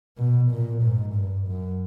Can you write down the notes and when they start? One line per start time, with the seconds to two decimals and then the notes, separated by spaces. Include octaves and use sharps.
0.18 B2
0.51 A#2
0.82 G#2
1.15 G2
1.47 F#2